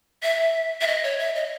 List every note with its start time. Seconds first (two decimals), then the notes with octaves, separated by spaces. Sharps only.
0.23 E5
0.81 E5
0.87 D#5
1.04 C#5
1.19 E5
1.36 D#5